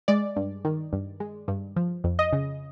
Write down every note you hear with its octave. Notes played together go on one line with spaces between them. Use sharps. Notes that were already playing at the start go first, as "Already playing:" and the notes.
G#3 D5
G2
D#3
G2
G#3
G2
F3
F2
D#5
C#3